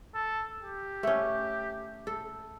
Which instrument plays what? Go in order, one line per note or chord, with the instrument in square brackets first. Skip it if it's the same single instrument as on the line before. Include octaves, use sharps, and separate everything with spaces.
[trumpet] A4
G4
[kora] A3 C#4
A4